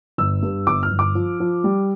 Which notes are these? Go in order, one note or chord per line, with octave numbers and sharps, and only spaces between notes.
G1 E6
G2
G1 D6
F6
G1
D6
F3
F3
G3